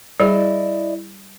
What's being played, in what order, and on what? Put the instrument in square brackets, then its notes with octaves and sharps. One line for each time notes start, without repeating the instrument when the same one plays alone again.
[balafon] G3 G#4 [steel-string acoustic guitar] E4 D5 D#5